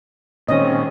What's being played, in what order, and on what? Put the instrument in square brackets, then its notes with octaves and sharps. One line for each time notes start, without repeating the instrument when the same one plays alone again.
[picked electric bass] A#2 D#3 [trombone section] G#3 C4 C#4 [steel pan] D#5